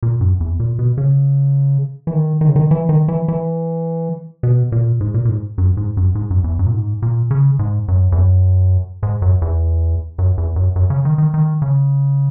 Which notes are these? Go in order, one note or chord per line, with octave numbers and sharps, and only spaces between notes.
A#2
F#2
E2
A#2
B2
C#3
E3
D#3
D#3
C#3
D#3
E3
D#3
E3
E3
B2
A#2
G#2
A#2
A#2
G#2
F#2
G#2
F#2
G#2
F#2
E2
F#2
A#2
G#2
A#2
C#3
G#2
F#2
E2
F#2
G#2
F#2
E2
F#2
E2
F#2
F#2
C#3
D#3
D#3
D#3
C#3